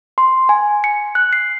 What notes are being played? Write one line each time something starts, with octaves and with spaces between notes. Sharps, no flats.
C6
G#5
C#7
F#6
C7